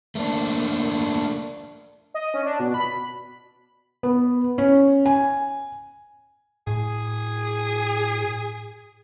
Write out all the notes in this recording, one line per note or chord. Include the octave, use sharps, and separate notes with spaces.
A3 A#3 D4
D#5
C#4
D4
B2
B5
B3
C#4
G#5
A2 G#4